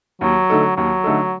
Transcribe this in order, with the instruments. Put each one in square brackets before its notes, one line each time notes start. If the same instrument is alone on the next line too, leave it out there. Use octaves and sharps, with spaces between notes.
[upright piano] D#2 [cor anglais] F#3
[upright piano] D3 A3 D#4 A4
[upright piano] D#2 [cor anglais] F#3
[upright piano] D3 A3 D#4 A4